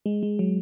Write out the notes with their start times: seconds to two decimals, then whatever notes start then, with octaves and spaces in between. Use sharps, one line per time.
0.06 G#3
0.23 G#3
0.39 F#3